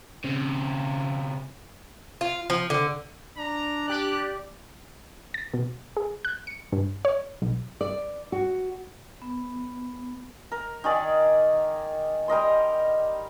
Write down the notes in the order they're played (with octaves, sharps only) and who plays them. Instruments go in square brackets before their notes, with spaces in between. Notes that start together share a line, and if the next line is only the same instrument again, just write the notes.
[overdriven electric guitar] C#3 C4
[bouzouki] F4
F3
D3
[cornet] D4 [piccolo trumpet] A#5
[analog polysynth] G4 D5 [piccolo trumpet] F#6
[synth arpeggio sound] A6
B2
G#4
F#6
C#7
G2
C#5
B1
[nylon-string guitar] D5
F#4
[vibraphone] B3
[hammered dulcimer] A#4
D#3 G#4 D5
G3 A#4 D#5 C6